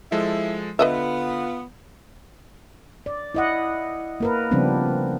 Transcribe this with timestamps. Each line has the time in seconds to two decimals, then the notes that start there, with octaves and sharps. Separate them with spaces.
0.12 F3 G#3 E4 A4
0.79 D3 B3 F4 B4 D#5 E5
3.06 D5
3.35 E4 D#5 F#5
4.20 A#3 A#4 B4
4.51 C#3 F3 G3 B3 C4 D4